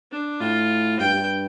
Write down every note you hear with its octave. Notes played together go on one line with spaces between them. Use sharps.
D4
A2 F4
G2 G5
G2